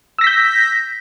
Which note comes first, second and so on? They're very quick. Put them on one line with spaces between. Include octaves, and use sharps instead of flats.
E6 A#6 B6 G6